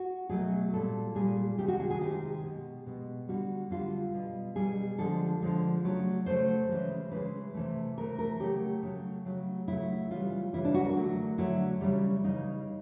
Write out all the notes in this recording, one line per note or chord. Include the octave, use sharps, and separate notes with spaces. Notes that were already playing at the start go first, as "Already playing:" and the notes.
Already playing: F#4
B2 F#3 A3 G#4
A#2 G3 A4
A#2 G3 G#4
C3 D#3 G#3 G4
F#4
G#4
G#4
C3 D#3 G#3 G4
B2 G#3
B2 G#3
D3 G3 F#4
D3 G3 F4
B2 G3
B2 G3 G#4
D3 F3 G#3 A4
D3 F3 G#3
C#3 F#3 A3
C#3 F#3 A3 C5
C#3 E3 G#3
C#3 E3 G#3 B4
C3 E3 A3
C3 E3 A3 A#4
A#4
C#3 F#3 A3 G4
C#3 F#3 A3
C#3 F#3 A3
C#3 F#3 A3 E4
C#3 E3 G3 F4
C#3 E3 G3 E4
D4
F#4
A#4
D3 F#3 A3
D3 F#3 A3 E4
C#3 E3 G3
C#3 E3 G3 D#4